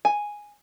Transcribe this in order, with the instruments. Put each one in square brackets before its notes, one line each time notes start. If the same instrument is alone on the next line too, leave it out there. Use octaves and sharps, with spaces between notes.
[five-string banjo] G#5